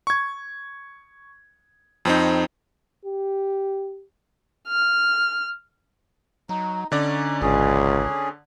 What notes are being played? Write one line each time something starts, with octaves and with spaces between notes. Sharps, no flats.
C#6 G#6
F2 C4 D#4
G4
F6
F#3 D#4
D3 C#4 D#4 D5 A#5
G#1 C#2 C#4 G#4